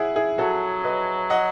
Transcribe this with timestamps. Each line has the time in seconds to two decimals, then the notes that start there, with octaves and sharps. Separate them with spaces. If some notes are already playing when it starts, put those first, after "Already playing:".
Already playing: E4 G#4 F#5
0.16 E4 G#4
0.38 F#3 F#4 A4
0.84 B4 D#5
1.30 D#5 F#5